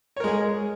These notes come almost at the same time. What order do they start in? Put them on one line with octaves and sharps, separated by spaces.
C#5 A#4 G#3 G#4